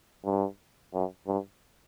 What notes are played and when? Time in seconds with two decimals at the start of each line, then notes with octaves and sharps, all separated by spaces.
0.24 G2
0.94 F#2
1.27 G2